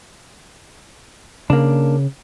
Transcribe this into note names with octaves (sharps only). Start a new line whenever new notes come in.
C#3 A#3 D4